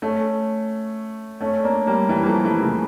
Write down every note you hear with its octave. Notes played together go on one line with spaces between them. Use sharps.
A3 C#4
A3 C#4
A#3 D4
G3 A#3
E3 G3
A#3
F3 A3
E3 G3
C#3 E3